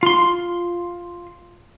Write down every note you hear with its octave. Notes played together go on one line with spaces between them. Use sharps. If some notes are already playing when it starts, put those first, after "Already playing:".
F4 C6